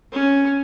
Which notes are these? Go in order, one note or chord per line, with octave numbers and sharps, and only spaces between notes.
C#4